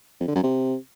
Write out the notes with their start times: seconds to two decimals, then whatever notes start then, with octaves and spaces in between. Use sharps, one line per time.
0.20 F2
0.28 D3
0.35 F#2
0.43 C3